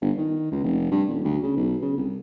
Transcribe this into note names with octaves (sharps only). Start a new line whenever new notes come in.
G1
D#3
C#2
F1
G2
D#1
D2
C#3
B1
C#3
C2